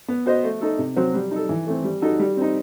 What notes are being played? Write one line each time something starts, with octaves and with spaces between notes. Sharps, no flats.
B3
F#4 C5 D#5
A3
D#4 A4
C3
F#3 C4 F#4 C5
G3
D#4 A4
E3
A3 C4
G3
D#4 F#4 A4
G3
C4 D#4